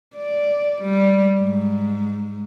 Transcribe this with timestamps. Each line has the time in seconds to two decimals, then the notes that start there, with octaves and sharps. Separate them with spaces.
0.17 D5
0.82 G3
1.41 G#2